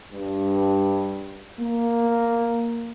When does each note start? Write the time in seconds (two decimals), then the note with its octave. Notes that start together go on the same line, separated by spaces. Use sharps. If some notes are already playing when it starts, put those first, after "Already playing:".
0.12 G2
1.61 A#3